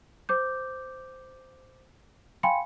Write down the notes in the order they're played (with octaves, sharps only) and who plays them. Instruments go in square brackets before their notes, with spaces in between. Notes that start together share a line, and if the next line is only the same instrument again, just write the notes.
[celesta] C5 D6 G6
F5 G5 G#5 B5 C6 C#7